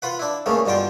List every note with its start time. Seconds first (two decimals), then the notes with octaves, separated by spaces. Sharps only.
0.02 F4 B4 F#5
0.19 D4 E4
0.46 C#2 A#2 C#3 A3 A#3
0.66 G2 B2 D3 F4 G5